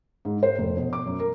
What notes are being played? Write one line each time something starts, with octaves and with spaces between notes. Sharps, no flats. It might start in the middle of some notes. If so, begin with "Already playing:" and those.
G#2
C5
F1
B2
D6
F#2
A#4